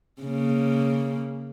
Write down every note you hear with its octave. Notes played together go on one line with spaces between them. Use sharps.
C#3 A#3